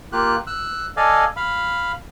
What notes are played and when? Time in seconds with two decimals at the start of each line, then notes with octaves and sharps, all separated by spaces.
0.13 A#3 F4 G4 F#6
0.47 E6 F#6
0.97 A4 D5 D#5 F5 G#5
1.36 F5 B5